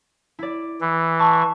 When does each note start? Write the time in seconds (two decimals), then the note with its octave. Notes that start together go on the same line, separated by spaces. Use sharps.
0.39 E4 D5
0.81 E3
1.19 A5 C#6